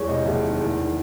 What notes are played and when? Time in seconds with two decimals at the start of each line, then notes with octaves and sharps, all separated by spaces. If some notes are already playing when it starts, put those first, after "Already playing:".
Already playing: E2 G#3 C#5
0.09 C3 D#5
0.26 F#1 E5
0.43 D#3
0.60 E2
0.78 D#3